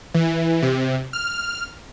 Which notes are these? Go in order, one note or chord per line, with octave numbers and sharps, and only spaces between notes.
E3
C3
F6